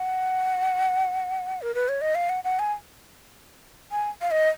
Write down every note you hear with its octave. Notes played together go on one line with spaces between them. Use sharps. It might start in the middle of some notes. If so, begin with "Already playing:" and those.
Already playing: F#5
A#4
B4
C#5
D#5
F5
F#5
F#5
G#5
G#5
F5
D#5